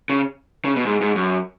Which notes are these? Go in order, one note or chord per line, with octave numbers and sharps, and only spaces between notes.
C#3
C#3
B2
G#2
G#2
F#2